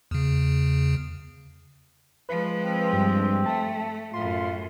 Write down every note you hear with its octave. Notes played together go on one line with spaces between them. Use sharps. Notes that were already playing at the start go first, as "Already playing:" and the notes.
E2 C#3
F3 G#3 B4
C4
G2
A3 A5
F#2 A2 F4 C6